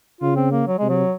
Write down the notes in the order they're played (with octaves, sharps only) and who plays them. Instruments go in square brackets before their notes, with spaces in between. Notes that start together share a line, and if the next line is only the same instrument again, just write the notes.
[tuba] C#3 [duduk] F4
[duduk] C4
A#3
F#3
[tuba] C3 [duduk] G#3
[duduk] F#3